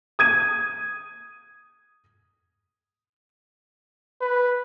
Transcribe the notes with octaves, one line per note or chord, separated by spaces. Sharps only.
D#6 G#6 D#7
B4